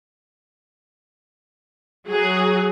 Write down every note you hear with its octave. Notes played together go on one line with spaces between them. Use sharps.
F#3 G#4